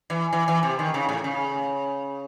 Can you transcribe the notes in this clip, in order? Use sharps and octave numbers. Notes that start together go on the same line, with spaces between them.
E3
E3
E3
C3
D#3
C#3
A2
C#3